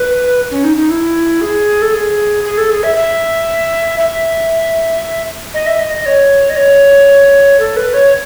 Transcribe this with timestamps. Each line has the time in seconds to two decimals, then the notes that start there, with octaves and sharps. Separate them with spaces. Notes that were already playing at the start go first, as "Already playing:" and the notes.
Already playing: B4
0.51 C#4
0.64 D#4
0.77 D#4
0.90 E4
1.41 G#4
1.82 A4
1.93 G#4
2.44 G#4
2.57 A4
2.70 G#4
2.83 E5
2.96 E5
3.99 E5
5.54 D#5
5.66 E5
5.79 D#5
5.95 D#5
6.06 C#5
6.49 D#5
6.56 C#5
7.60 A4
7.76 B4
7.94 C#5